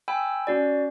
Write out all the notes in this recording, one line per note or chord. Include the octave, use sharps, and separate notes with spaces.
G5 G#5 B5 E6
C#4 F#4 D5